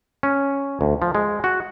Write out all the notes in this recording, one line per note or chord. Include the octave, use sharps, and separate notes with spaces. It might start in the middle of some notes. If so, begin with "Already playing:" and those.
C#4
D2
F3
G#3
F#4